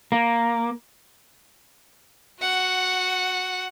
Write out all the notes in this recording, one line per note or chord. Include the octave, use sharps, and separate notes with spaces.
A#3
F#4 F#5